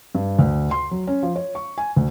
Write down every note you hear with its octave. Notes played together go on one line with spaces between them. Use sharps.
G2
D2
C6
F#3
C#4
F3
C#5
C#6
G#5
D2